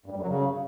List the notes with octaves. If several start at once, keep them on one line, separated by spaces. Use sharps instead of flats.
G2
G3
F#2
F#3
C#3